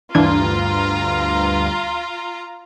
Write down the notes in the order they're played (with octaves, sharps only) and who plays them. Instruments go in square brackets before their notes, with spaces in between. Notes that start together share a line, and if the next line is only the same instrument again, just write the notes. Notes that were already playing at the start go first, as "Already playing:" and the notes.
[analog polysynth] D2 G2 [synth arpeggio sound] E3 D4 G#6 [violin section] F4 A#5